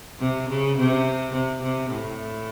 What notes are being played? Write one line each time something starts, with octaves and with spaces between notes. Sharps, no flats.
C3
C#3
C3
C3
C3
A2